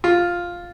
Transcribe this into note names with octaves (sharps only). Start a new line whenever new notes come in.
F4